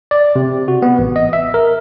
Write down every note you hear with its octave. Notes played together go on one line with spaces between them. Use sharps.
D5
C3
F#4
B3
A1
D#5
E5
A#4